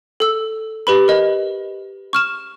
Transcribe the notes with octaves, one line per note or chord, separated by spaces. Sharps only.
A4 E6
G4 B4 B5
A#4 D#5
C#6 F6 E7